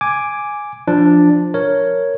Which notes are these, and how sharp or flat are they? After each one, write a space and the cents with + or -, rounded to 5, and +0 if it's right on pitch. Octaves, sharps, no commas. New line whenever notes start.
G#5 +0 D6 +0
F3 +0 D4 +0
A#4 +0 C#5 +0